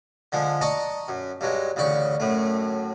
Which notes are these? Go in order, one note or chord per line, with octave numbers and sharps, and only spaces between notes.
D3 F3 G#3
D5 D#5 A5 A#5 C#6
F#2
G2 F#3 G#3
A1 D2 C#3 D5 C#6
F#2 A2 A3